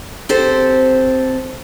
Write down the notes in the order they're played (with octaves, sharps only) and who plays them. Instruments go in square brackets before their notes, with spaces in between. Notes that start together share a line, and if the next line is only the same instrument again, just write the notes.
[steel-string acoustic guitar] C4 G4 A4 C5